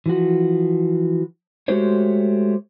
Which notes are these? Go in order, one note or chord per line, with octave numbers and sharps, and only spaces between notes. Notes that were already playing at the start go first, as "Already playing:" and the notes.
E3 F3 F#4
G#3 A3 F#4 G4 C5 C#5